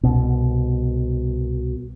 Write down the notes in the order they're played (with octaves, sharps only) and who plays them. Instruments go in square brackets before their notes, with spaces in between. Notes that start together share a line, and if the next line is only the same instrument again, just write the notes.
[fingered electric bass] C2 B2